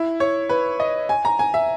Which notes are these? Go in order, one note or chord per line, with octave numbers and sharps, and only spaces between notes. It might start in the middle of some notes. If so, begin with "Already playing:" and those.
Already playing: E4
C#5
B4
D#5
G#5
A#5
G#5
E5